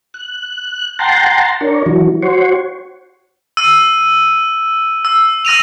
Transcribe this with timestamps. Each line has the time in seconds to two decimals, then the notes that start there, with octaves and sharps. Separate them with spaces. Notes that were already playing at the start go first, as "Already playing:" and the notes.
0.14 F#6
0.99 F#5 G5 A5 A#5 C6
1.61 D4 A#4 C#5
1.86 E3 F#3
2.23 F#4 C5 C#5
3.57 E6 D#7
5.05 E6
5.45 E6 A#6 D#7 F7